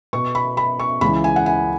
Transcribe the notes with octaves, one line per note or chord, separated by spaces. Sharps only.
B2 B3 C#6
B5
B5
C#6
C#2 C#3 E3 B5
G#5
F#5
G#5